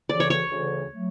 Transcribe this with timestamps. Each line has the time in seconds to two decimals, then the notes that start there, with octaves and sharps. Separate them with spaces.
0.09 D2 C#3 E3 D5
0.20 C#5
0.30 C#5
0.51 D2 C#3 E3
0.92 F#3 A3